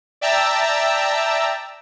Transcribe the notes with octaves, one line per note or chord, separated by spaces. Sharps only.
D5 E5 G5 A5 A#5 E6